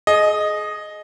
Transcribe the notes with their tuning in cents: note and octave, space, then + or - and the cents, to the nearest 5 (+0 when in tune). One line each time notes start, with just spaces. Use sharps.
G#4 +35 D#5 -5